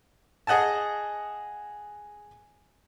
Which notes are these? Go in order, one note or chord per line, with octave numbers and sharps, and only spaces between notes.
G#4 D#5 F#5 G#5 A5